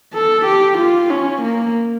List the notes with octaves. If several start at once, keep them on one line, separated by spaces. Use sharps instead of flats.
A4
G4
F4
C#4
A#3